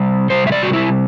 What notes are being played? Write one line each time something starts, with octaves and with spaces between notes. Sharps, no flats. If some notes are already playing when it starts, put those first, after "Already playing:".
Already playing: C3 G3
C3 G3 C5
E5
D5
F#4
E4